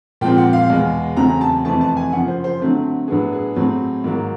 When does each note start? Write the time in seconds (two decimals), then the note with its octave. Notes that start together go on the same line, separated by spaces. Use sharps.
0.21 A#2 F3 G#3 C4 G5
0.38 F#5
0.53 F5
0.69 E2 B2 G#3
1.17 E2 C#3 F#3 A3 C4 A#5
1.41 A5
1.65 F2 C3 E3 A3 C4 A5
1.81 A5
1.97 G#5
2.13 F#2 C#3 F3 F#5
2.28 C5
2.44 C5
2.60 D3 F#3 A3 C4
3.08 A2 F#3 B3 D4 G#4
3.33 G#4
3.56 A2 F#3 A3 C4
4.04 G#2 D#3 F#3 A#3